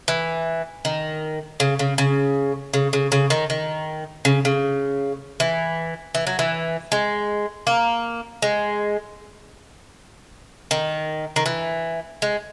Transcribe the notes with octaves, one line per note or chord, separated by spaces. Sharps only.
E3
D#3
C#3
C#3
C#3
C#3
C#3
C#3
D#3
D#3
C#3
C#3
E3
E3
F#3
E3
G#3
A#3
G#3
D#3
D#3
E3
G#3